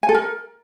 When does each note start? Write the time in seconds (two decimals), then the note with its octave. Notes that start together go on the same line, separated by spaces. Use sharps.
0.03 G#5
0.09 A4
0.15 A#4